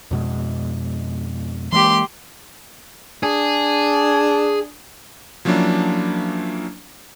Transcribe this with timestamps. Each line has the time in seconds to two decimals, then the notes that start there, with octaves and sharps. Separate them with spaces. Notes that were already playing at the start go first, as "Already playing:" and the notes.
0.11 F2 B2 G#3
1.72 E3 G#3 A#3 G4 C6
3.23 D4 G#4
5.45 F3 F#3 A#3 C#4 D4 E4